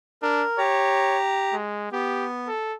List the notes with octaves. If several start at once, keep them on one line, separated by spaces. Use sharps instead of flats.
D4 A#4
G4 C#5 A#5
G#3
B3 G4
A4